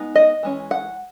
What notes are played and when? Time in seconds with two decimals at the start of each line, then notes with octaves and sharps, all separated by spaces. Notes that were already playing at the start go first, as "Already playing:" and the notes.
Already playing: G#3 B3 D#4
0.15 D#5
0.43 E3 G#3 C#4
0.71 F#5